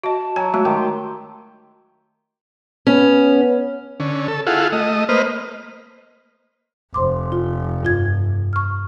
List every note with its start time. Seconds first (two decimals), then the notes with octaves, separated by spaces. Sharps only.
0.04 F#4 D#5 A5
0.36 F#3 C#5 G#5
0.54 G#3 A3 F#4
0.65 D#3 G4
0.77 C6
2.87 B3 C#4
4.00 D3 C#4
4.28 A4
4.47 E4 F4 G#4 A4 F5 F#5
4.72 A3 D#5
5.09 A#3 B4 C5 D#5 F6
6.94 F1 C5 C6 D6
7.32 F4
7.83 G2 F4 G#6
8.53 C#6 F6